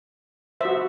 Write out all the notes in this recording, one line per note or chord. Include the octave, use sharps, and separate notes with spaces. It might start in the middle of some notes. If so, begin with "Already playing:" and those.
F#4 C5 E5